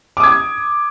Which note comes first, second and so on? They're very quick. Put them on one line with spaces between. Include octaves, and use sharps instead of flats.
D6 D#6 G#6